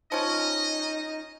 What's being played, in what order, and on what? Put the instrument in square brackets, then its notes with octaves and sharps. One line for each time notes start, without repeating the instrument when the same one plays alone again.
[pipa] F3 C#4 [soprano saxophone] D#4 [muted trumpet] D#5